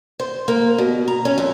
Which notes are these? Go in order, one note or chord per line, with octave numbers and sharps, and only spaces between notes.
C5
A#3
B2
A#5
C#4
F2